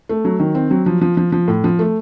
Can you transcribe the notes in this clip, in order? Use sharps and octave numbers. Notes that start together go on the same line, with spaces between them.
A3
F#3
D#3
C4
F#3
F3
F3
F3
F3
A2
F3
A3